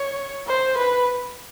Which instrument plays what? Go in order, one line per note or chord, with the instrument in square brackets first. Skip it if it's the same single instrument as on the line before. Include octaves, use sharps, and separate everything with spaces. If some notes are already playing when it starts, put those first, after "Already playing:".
Already playing: [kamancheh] C#5
C5
B4